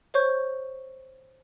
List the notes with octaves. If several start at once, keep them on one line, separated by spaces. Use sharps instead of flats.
C5 C#5 C#6 G6